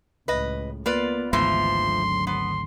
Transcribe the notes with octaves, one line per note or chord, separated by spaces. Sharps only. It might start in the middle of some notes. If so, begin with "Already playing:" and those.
C#2 A2 B4 D#5
A#3 B3 F4 B4 D5
G#1 D2 G#2 E3 F3 C6
D3 F#3
B3 C6